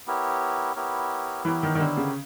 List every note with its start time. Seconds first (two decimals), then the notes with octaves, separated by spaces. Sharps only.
0.07 B3 E4 G4 A#4 C#5
0.76 B3 E4 G4 A#4 C#5
1.45 E3 B3 E4 G4 A#4 C#5
1.63 D#3
1.75 D#3
1.80 D3
1.97 C#3